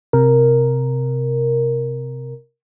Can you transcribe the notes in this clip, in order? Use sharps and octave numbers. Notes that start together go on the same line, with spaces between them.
C3 A#4